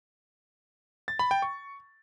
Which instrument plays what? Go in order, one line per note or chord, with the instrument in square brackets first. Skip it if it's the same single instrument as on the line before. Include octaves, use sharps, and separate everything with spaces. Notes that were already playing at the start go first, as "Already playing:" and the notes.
[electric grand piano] A6
B5
G5
C#6